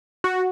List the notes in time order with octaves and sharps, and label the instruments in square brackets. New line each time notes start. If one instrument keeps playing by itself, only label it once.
[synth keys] F#4